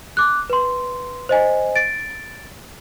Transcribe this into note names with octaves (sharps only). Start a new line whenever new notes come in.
D6 F#6
B4 C6
C5 D#5 G#5
A6 D7